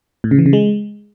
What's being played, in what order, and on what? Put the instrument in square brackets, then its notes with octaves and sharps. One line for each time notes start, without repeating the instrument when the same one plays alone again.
[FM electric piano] A2
C#3
E3
C#3
G#3